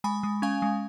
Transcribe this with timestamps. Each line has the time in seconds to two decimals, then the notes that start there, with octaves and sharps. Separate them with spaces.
0.04 G#3 G#5 B5
0.23 G#3
0.42 C#4 F5 G#5
0.62 G#3